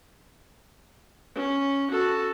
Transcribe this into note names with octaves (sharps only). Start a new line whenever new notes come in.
C#4
F#4 A4